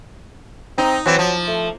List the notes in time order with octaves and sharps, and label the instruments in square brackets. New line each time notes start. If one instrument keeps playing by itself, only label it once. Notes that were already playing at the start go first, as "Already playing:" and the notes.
[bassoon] C4 [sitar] D#4
[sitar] E3 C4 [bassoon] F#3
[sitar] F3
[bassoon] A3